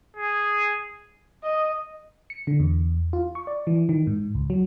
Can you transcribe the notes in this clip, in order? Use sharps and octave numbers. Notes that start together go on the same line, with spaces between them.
G#4
D#5
C#7
D3
E2
F4
C#6
D5
E3
D#3
G#2
C#2
F#3